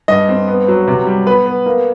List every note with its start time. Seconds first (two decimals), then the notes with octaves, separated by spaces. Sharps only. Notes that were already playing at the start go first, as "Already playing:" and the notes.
0.08 G2 D#5
0.29 C4
0.48 B3
0.68 F#3
0.88 C3
1.07 G3
1.26 B3 B4
1.46 B3
1.66 A#3